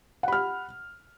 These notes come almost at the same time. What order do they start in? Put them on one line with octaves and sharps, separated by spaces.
F#5 B5 F6